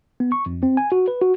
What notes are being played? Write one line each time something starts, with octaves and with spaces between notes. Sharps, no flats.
B3
C#6
F2
C4
G#5
F#4
B4
F#4